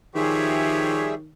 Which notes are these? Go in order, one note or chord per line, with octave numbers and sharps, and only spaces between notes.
D#3 F3 G3 G4 G#4 C#5 E5